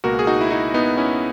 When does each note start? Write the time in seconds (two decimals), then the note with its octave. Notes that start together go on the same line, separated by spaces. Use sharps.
0.04 C#2 B2 A#3 F#4 A#4
0.19 G#4
0.27 D#4 F#4
0.41 E4
0.50 D#4 F#4
0.74 B3 D#4
0.97 C#4 E4